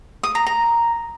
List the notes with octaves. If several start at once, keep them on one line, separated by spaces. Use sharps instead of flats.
D#6
A#5
A#5